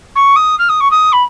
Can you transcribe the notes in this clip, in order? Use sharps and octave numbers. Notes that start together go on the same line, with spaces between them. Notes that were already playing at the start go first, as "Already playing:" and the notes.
C#6
D#6
F6
D#6
C#6
D#6
B5